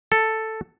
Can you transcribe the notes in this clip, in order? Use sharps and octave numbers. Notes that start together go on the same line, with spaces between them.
A4